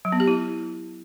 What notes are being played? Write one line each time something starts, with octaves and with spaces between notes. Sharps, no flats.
F#3
B3
G4
E4